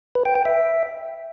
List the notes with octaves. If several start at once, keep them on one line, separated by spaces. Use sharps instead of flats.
B4
G5
G5
E5